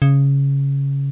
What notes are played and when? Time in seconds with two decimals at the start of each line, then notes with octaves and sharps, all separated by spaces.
0.02 C#3